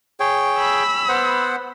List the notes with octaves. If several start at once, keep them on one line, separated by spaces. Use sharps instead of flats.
G#4 C#5 G5
B5 E6
B3 C5 F#5